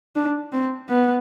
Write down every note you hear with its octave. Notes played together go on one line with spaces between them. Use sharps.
D4
C4
B3